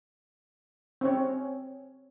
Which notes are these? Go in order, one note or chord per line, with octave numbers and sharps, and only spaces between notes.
C4 C#4 C#5